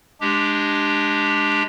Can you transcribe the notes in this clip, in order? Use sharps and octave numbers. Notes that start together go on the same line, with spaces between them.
G#3 D4 G4